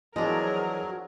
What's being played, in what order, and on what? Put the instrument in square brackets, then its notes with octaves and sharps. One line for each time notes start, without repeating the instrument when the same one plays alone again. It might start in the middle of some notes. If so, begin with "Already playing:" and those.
[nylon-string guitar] E2 D#5 [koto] F3 D4 [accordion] F#3 [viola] G#4 A#4